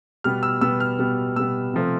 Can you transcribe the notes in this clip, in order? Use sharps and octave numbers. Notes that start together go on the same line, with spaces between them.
B2 G3 B3 F6
E6
B2 G3 B3 E6
F6
B2 G3 B3
B2 G3 B3 E6
C3 F3 A3 C4